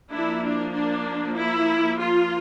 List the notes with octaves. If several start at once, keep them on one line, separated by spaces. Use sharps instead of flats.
F3 A#3 D4 E4
D4
D4
E4
F4